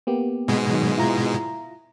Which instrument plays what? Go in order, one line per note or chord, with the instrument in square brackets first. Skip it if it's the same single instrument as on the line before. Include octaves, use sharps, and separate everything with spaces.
[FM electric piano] A#3 B3 G4
[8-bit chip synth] G#2 B2 G#3
[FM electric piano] D#3 F#3
E4 F4 A#5